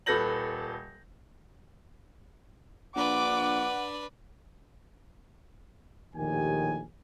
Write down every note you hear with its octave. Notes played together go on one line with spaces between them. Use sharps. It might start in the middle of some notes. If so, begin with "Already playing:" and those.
D#1 A4 B4 G6 A#6 F#7
A#1 D4 B4 F#5 D6
A#1 D#2 A2 D#3 G4 G#5